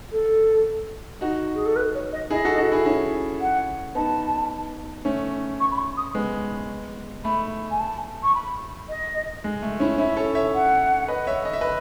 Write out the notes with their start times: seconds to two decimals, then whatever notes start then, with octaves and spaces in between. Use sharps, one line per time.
0.12 A4
1.21 D#4 F#4
1.55 G#4
1.66 A4
1.76 B4
1.94 C#5
2.12 D#5
2.31 E4 G#4 D#5
2.45 F#4 A4
2.58 F#4 A4
2.72 E4 G#4
2.86 C#4 E4
3.41 F#5
3.95 B3 D#4 A5
5.05 A3 C#4
5.60 C#6
5.71 B5
5.78 C#6
5.97 D#6
6.15 G#3 B3
7.24 A3 B5
7.71 G#5
7.79 A5
8.23 C#6
8.35 B5
8.89 D#5
9.44 G#3
9.62 A3
9.80 C#4 E4
9.98 C#4 E4 E5
10.17 A4 C#5
10.35 C#5 E5
10.54 F#5
11.08 B4 D#5
11.27 C#5 E5
11.45 D#5
11.53 E5
11.61 B4 D#5